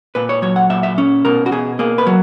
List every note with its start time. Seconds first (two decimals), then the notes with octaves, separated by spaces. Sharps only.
0.15 A#2 B4
0.29 C#5
0.42 F#3 C#5
0.56 F#5
0.70 A#2 E5
0.83 E5
0.98 C#4
1.25 B2 A#4
1.46 F#4
1.52 B2 G#4
1.79 A#3 G#4
1.98 B4
2.07 F#3